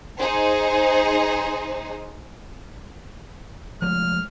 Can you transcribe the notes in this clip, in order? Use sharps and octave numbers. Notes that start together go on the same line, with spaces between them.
D#4 G#4 C5
F3 G#3 A3 F6